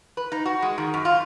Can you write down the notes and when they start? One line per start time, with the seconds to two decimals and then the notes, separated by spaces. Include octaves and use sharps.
0.17 B4
0.32 D#4
0.45 F#4
0.62 G#3
0.78 D#3
0.94 F#2
1.05 F4